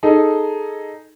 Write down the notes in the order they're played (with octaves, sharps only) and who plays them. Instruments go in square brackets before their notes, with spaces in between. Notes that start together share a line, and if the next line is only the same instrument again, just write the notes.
[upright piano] D#4 G#4 A4